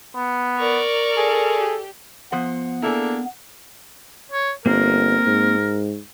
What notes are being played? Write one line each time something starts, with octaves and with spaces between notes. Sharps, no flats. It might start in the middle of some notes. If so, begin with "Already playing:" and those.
B3
A#4 D5 C#6
G#4 A4
G4
F3 B3 C5 F#5
A#3 D4 E4 G#4 A4
C#5
G1 A#3 C4 A#4
G#2